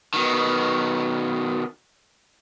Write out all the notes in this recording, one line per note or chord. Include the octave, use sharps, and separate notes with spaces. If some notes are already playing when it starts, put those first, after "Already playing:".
B2 D#3